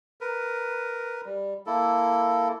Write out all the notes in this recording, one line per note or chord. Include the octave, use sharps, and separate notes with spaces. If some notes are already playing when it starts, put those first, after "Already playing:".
A#4 B4
G3
A#3 E4 A4